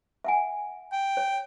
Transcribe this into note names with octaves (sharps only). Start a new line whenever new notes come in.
E5 F#5 G#5
G5
C#5